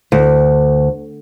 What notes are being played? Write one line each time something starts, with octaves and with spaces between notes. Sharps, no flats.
D2